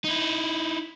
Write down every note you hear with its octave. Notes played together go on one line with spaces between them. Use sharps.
D#4 E4